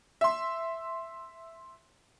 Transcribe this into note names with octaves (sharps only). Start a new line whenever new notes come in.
E5 C6